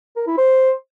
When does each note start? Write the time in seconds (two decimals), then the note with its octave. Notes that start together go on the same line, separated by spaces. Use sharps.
0.16 A#4
0.27 E4
0.38 C5